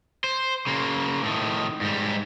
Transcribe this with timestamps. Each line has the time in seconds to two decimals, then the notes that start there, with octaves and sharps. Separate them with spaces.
0.24 C5
0.67 C#3 A#3
1.23 A2 D#3
1.81 G#2 G3